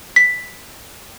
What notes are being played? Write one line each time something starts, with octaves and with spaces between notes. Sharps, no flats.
B6